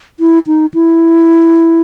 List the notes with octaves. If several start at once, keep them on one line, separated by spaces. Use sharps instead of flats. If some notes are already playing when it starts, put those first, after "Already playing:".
E4
D#4
E4